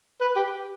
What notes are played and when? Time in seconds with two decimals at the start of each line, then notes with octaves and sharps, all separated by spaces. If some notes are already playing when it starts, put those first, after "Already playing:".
0.21 B4
0.36 G4